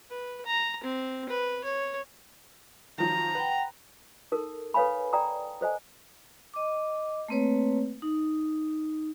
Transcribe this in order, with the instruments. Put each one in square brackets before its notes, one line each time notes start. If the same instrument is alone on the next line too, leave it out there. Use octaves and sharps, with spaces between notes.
[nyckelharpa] B4
A#5
C4
B4
C#5
[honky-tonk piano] D#3 F3 F#3 [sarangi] A#5
[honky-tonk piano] B4 [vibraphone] F#5 G5
[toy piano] D#4 A4 A#4
A4 B4 C#5 F5 G#5 B5
D5 G5 A#5 D#6
A4 C5 D#5 G#5
[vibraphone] D#5 D6
A3 A#3 C4 B4 C#5
D#4